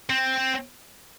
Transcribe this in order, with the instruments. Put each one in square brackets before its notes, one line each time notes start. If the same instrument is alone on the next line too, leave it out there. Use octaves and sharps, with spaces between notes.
[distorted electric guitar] C4